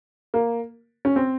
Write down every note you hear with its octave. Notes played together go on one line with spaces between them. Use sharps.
A#3
C#4
C4